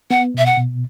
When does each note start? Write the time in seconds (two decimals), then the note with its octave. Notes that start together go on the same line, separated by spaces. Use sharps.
0.11 B3 F#5
0.34 B2 E5
0.46 F#5
0.57 B2